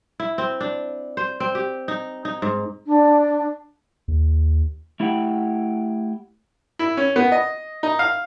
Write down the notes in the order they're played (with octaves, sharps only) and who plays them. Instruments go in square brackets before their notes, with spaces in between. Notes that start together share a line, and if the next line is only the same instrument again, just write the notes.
[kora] E4
C4
D4
C5
C4
G4
D#4
D#4
G#2
[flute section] D4
[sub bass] D#2
[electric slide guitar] A3 E4 G4 F#5 G5
[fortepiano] E4
C#4
B3
D#5
D#4
F5